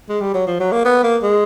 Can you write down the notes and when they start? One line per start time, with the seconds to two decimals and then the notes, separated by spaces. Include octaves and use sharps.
0.09 G#3
0.21 G3
0.34 F#3
0.47 F3
0.60 F#3
0.72 A#3
0.85 B3
1.03 A#3
1.22 G#3